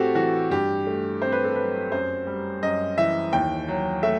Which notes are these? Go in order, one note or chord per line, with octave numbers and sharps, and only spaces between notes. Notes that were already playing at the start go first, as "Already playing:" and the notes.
Already playing: A2 A3 C4 F#4 G4 A4
E3 F#4
G2 G4
A3
C4 C5
B4
A4
F#3 B4
F#2 C5
G3
F#2 D#5
E3 E5
D#2 G5
F#3
A3 E5